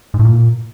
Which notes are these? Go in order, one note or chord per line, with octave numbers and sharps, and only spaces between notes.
G#2
A2
A#2